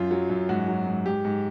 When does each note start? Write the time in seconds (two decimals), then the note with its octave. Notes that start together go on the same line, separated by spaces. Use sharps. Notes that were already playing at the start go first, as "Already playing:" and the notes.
Already playing: F#2 F4
0.11 F#3
0.30 F#2
0.49 G#2 F#4
0.68 F#3
0.87 G#2
1.05 G#2 G4
1.25 G#2